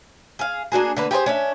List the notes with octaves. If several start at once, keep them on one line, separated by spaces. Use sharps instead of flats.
G#4 F5
A#3 D4 F#4 G#4
D3 A#3 B4
G4 G#4 A#4 C5
C#4 D4 E5